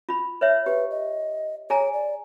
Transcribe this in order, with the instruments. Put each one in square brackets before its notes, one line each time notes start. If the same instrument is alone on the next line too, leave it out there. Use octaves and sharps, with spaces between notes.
[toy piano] F4 B5
B4 C#5 E5
[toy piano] G4 [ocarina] B4
[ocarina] D#5
[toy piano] G#4 G#5 A#5 [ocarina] C#5
[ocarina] D5